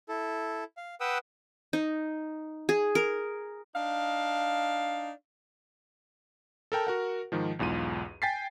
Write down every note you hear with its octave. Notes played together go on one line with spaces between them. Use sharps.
E4 A4
F5
B4 F#5 G5 D#6 E6
D#4
G#4
A#4
D4 D#4 F5
A4 A#4 G5 A5
F#4 A#4 F#5
G#2 D#3 F3
B1 E2 G#2 F4 D#7
G5 G#5 A6 B6 C7